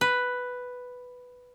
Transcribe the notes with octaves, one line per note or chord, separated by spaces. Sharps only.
B4